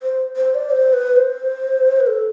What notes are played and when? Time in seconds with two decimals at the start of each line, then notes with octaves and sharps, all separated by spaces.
0.03 C5
0.37 C5
0.55 D5
0.71 C5
0.93 B4
1.16 C5
2.00 B4
2.07 A4